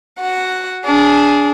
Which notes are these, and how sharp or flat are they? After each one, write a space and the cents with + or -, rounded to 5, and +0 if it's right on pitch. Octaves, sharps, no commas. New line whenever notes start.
F#4 +0 F#5 +0
D4 -20 G#4 +0